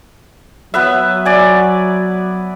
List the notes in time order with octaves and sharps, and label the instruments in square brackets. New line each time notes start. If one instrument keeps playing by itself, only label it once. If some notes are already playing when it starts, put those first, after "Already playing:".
[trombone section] F#3 [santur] B3 B4 E5
[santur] D5 G#5